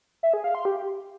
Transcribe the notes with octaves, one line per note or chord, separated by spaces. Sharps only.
E5
G#4
F5
C6
G4